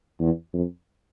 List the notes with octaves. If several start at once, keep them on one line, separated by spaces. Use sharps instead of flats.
E2
F2